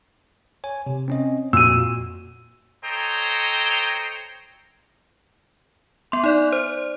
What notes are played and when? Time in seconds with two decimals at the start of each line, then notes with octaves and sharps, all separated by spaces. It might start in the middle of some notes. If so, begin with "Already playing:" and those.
0.64 C#5 G#5
0.87 C3
1.08 C4 C#4 D#5
1.53 F2 A#2 F#4 E6 D#7
2.84 A4 C5 C#5 D#5 G5 A#5
6.12 B3 C6
6.24 D#4 D5 F#6
6.52 C5